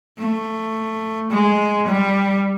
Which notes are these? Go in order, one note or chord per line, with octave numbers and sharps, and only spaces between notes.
A3
G#3
G3